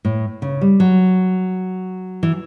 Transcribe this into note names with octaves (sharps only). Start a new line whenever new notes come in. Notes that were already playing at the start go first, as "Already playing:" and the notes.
A2
C#3
G3
F#3
E3